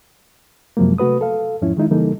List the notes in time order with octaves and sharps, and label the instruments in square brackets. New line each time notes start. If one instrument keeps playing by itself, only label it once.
[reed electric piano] F#2 C3 F3 F#3 G#3 A#3
C3 A3 F#4 B4 D#6
A4 F5
E2 G#2 F3 C#4 E4
D#3 G#3 D#4 E4
C#3 E3 G3 A#3 D#4 A4